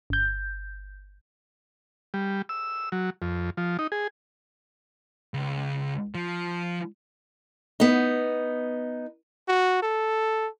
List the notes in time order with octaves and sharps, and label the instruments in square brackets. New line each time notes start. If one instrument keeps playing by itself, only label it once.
[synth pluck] G1 G6
[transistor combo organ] G3
E6
F#3
F2
F3
D#4
G#4
[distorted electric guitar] C#2
F3
[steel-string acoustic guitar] B3 D#4
[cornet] F#4
A4